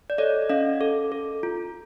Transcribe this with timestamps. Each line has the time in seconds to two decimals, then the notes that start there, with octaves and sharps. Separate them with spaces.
0.10 D5
0.18 A4 C#5 D#5
0.49 C#4 D#5 F5
0.81 A4
1.12 A4
1.43 F4